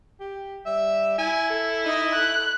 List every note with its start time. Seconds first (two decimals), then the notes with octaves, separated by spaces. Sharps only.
0.20 G4
0.66 G3 E5
1.18 E4 G#5
1.50 A4
1.86 D#4 D#5
2.15 A4 F#6